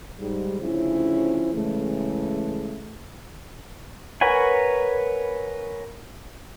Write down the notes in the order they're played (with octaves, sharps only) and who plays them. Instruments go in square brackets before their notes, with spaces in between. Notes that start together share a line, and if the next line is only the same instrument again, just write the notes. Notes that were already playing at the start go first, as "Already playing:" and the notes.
[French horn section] G#2 G3
D2 C#3 F3 C#4 E4 C5
C#3 E3 G#3 A3
[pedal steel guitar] A#4 B4 C#5 F#5 G#5